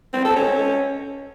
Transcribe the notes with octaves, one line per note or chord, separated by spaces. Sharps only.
C4
A4
C#4